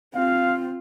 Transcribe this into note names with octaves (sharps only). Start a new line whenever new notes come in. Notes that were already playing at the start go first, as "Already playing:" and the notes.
C4 F4 F5